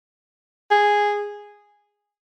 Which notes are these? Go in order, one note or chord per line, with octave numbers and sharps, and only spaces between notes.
G#4